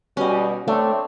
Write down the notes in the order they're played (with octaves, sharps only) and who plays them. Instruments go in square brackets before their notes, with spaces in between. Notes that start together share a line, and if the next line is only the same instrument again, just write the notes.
[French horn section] B2 G3 [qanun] C#4 D#5
[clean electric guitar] A3 [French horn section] C4 C#5 [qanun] D4